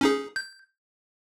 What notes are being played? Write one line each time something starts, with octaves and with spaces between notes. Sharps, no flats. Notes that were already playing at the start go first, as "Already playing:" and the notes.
C#4 D#4 G#4
G6